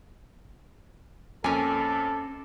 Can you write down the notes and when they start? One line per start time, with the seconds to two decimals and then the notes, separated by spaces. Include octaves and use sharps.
1.44 F2 A#3 C#4 A4 G#5 D6